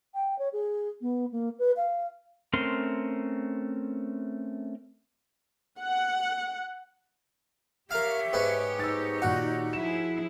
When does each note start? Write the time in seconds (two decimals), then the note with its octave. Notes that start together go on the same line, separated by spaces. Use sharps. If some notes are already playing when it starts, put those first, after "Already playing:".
0.14 G5
0.38 C#5
0.52 G#4
1.01 B3
1.31 A#3
1.58 B4
1.76 F5
2.53 A3 C4 C#4 A#4 C6
5.80 F#5
7.91 G4 A#4 C#5 E5 F5
8.33 G#2 B3 C#4
8.79 D#4 E6 A6
9.22 A#2 D#3 F#4 F#5
9.73 F3 E4 G#4 E7